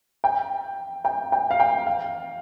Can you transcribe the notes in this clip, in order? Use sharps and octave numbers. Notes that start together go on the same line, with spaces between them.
G5
G5
G5
F5
G5
F5